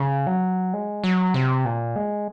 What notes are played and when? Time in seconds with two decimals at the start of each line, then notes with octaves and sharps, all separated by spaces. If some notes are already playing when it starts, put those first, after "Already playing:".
Already playing: C#3
0.27 F#3
0.73 G#3
1.04 F#3
1.34 C3
1.65 A#2
1.96 G#3